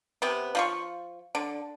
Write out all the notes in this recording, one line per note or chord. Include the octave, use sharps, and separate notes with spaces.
C3 B3
F3 F4 C#6
D3